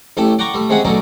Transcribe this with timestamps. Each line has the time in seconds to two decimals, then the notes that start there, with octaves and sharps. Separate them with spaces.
0.17 A1 A3 C#4 G4 A4
0.39 D5 F#5 G5 A#5 C#6 D6
0.54 G3 A3
0.70 C3 G#3 C#4 G#4 F#5 D#6
0.85 B1 F#3 A3 C#4 D#4 D5